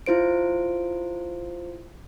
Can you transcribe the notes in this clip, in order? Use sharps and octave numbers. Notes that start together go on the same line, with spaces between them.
E4 F4 C5 D7